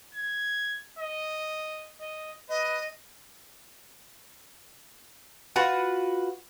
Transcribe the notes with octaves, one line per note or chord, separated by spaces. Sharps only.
G#6
D#5
D#5
B4 D#5
F4 F#4 B4 F#5